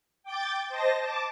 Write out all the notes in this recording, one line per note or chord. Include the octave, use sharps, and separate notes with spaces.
G5 D6 G6 A6
C5 D#5 A5 A#6
A5 D6